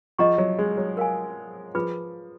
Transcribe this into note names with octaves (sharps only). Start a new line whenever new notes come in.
F3 G#4 D#5 F#5 A#5 C#6
F#3
G#3
F#3
A#4 F5 G#5
F3 F4 G#4 B4